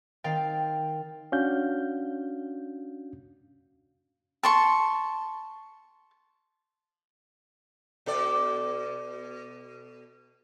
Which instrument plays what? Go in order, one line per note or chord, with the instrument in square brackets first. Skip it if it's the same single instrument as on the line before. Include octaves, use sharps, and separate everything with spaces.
[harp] D#3 C4 F5 G5 A6
[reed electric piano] C#4 D4 F#4 F5 G6
[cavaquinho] A5 C6 C#6
[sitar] B2 A4 D5